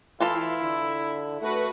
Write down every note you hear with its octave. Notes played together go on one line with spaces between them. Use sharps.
E3 E4 F4 A4 F5
D3
A3 F#4 B4